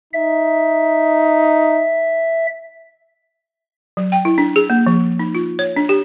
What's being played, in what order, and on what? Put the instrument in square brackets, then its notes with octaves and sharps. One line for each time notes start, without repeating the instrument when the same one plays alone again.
[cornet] D#4 [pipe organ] E5
[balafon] F#3
G5
E4
D4
G#4
A#3
F3
D#4
F4
C#5
D4
G4